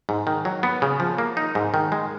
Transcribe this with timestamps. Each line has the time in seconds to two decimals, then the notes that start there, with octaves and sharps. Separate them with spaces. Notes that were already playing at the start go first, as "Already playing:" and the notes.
0.09 G#2
0.27 D#3
0.45 F#3
0.63 B3
0.82 C#3
1.00 F3
1.18 A#3
1.37 D#4
1.55 G#2
1.74 D#3
1.92 G#3